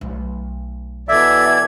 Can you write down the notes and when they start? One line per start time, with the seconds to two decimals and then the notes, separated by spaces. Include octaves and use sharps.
0.01 B1 A3
1.09 B2 E3 A4 D5 E5 G#6